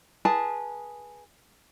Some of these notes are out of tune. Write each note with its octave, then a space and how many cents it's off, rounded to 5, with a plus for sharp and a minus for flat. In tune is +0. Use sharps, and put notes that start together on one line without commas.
G#4 +0 B4 -25 A5 +0